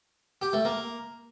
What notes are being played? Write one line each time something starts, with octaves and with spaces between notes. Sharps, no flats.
G4
A3
A#3